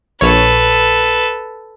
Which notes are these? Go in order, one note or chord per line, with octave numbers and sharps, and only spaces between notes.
A#1 A4 B4 C#5